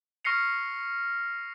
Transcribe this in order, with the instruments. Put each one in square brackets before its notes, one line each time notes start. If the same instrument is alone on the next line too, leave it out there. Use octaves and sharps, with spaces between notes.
[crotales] C#6 F6 A#6 C7 C#7 F7